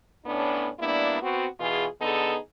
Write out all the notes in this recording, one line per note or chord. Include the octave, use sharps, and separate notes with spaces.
A2 B3 C#4 D4
G3 A#3 B3 D4 E4
B3 C4 F#4
B2 E3 F4 G#4
D3 B3 D#4 G#4 A4